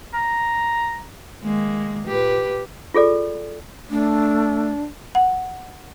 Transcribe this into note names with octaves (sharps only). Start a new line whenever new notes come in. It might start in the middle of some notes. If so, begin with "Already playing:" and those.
A#5
D#3 G#3 A#3
A#2 G4 B4
F4 G#4 A4 D5
A3 D4
F#5